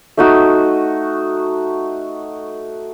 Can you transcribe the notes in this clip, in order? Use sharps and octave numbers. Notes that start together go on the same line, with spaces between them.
A3 D#4 F#4